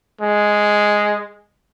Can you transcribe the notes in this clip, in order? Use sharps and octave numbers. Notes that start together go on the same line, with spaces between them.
G#3